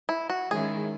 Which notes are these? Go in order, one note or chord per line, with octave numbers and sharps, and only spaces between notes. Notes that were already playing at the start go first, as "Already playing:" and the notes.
E4
F#4
D#3 G#3 C#4 E4 G#4